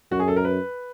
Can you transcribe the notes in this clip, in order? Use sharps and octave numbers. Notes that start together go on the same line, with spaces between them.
F#2 F#4
G#4
A4
A#4
B4